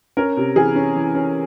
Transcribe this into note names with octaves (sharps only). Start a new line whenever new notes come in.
C#4 A#4
C3
E3 G#4
C#4
E3
C#4